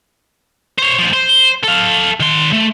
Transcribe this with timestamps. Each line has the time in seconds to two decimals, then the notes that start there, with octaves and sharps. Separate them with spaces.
0.79 C5 C#5
0.99 D2 F3
1.13 C5
1.63 A4 F5
2.20 D#3 C6
2.53 A3